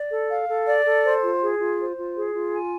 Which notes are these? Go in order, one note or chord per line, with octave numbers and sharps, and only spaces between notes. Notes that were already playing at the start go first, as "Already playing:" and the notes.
Already playing: D5
A4
F5
A4
D5
A4
C5
F4
G#4
F4
C5
F4
G#4
F4
G#5